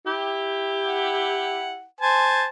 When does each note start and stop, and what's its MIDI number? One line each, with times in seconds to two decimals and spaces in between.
0.04 1.77 64
0.04 1.77 67
0.85 1.85 78
2.01 2.47 72
2.01 2.47 80
2.01 2.47 81